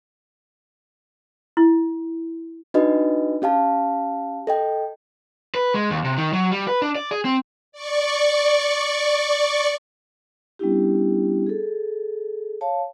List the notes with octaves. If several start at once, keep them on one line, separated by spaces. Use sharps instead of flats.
E4
D4 D#4 F#4 B4 D#5
C#4 G4 F5 A5
A4 D#5 G5
B4
G#3
D#2
C3
D#3
F#3
G3
B4
D4
D5
G#4
C4
D5 C#6
G3 B3 C#4 D4 E4 G4
G#4 A4
C#5 F5 A5